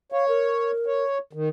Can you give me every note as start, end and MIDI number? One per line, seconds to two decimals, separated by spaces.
0.12 0.71 73
0.12 0.28 77
0.28 1.04 70
0.86 1.18 73
1.33 1.49 51